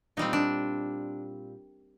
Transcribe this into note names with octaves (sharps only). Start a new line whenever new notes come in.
A#2 G3 C4 D#4
D4